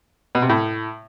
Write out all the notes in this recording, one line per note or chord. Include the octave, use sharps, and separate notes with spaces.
B2
C3
A2